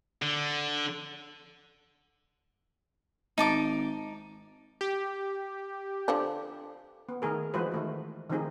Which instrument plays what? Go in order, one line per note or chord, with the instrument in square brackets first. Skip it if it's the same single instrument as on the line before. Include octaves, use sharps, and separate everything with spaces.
[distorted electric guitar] D3
[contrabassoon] G#1 [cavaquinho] D#4 A5 D6
[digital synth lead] G4
[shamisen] D3 F3 D4
[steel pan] B3
D#3 A3 G#4 A#4
E3 F3 G#3 F#4 B4 C5
D#3 A3 F#4
D#3 F3 A3 C4 D#4 G#4